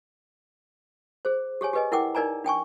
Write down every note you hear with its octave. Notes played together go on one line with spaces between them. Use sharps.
G#4 C5
G4 G#4 C#5 G#5
G4 G#4 B4 D#5 G#5
E4 A#4 F#5 G5 D6
D#4 A#4 D5 G#5 A#5
D4 G5 G#5 C#6